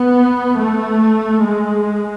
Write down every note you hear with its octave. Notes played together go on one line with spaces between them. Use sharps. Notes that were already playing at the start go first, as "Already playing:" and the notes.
Already playing: B3
A3
G#3